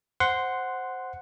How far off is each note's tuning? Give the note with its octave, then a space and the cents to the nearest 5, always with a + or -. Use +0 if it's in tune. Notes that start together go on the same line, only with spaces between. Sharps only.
C5 +0 F#5 +0 C6 -10